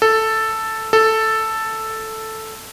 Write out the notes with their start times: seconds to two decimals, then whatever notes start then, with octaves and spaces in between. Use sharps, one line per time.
0.02 A4
0.93 A4